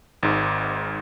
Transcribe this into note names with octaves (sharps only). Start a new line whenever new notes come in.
G#1 G#2